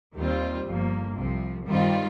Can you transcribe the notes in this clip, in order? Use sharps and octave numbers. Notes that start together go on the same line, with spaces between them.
D#2 D#3 G3 C4 F4
G1 G2 F3 A#3
C2 C3 F3
G2 D#3 G3 C4 F4